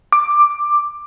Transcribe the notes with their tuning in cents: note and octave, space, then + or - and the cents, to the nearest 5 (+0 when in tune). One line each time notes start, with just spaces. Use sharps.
D6 +10